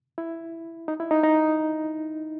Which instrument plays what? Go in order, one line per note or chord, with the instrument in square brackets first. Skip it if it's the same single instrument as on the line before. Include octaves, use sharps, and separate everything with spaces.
[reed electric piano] E4
D#4
E4
D#4
D#4